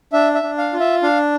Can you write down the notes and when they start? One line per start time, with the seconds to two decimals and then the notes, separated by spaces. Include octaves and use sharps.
0.13 D4 E5
0.35 E5
0.43 D4
0.58 F5
0.73 F4
0.80 E5
1.03 D4 F5